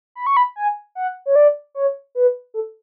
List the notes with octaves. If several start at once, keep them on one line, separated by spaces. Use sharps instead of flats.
B5
C#6
B5
G#5
F#5
C#5
D5
C#5
B4
A4